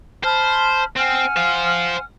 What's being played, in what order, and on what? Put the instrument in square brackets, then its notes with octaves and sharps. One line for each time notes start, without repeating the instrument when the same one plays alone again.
[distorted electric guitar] C5 [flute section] A5 B5 F6
[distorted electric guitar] C4 [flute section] F#5 G#5 F6
[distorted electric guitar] C5 F5